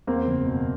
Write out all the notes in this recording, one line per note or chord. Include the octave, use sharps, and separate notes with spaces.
E2 A#3 C4
F#1
B2